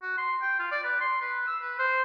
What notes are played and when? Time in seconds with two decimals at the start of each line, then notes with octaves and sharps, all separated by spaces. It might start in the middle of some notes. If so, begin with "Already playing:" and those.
0.03 F#4
0.18 C6
0.42 G5
0.59 F4
0.72 D5
0.84 B4
1.01 C6
1.22 B4
1.47 E6
1.62 B4
1.79 C5